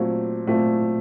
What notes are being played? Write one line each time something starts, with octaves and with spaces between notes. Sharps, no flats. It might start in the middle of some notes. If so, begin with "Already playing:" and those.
Already playing: A#2 F#3 A3 C4
A#2 F#3 A3 C4